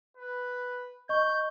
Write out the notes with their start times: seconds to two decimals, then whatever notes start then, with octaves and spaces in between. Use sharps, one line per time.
0.17 B4
1.09 D#5 C#6 G6